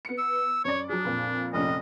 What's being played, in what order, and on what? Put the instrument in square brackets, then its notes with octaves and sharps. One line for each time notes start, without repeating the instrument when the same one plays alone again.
[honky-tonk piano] B3 C#7
[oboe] E6
[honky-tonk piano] F#2 D5 [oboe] C#5
[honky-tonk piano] F#3 G#4 [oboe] D4
[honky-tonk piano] F2 A#2
[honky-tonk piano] F1 A#1 C#4 [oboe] D#5